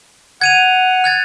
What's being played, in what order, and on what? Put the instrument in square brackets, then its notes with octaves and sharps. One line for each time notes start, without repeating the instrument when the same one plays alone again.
[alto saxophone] F#5 [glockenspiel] G#6 D#7 F7
[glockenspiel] F#6 G#6 A6